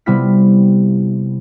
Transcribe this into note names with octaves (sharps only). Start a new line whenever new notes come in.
C3 G3 B3 E4 F6 B6